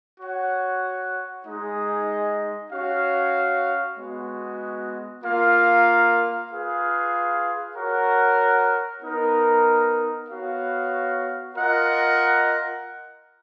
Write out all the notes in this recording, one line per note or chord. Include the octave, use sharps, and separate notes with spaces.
F#4 C#5 F#5
G#3 D#4 G#4 D#5
C#4 F#4 C#5 F5
G#3 B3 F#4
A#3 F4 A#4 F5
F4 G#4 B4 F5
F#4 A#4 C#5 F#5
B3 D#4 A#4
B3 F#4 C#5 F5
F4 A#4 D#5 F#5